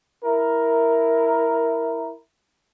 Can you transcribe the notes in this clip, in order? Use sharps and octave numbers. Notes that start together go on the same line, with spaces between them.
E4 A#4